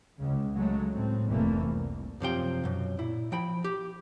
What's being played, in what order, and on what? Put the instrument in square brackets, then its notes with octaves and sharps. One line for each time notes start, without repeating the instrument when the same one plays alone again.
[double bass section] C#2 C#3
C#3 F#3 G#3 A3
A2 C4
F1 E2 E3 A3 A#3
C2
[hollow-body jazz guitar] F#2 C3 F3 G5
B1 F#2
A#2 E4
F3 G5 B5
G4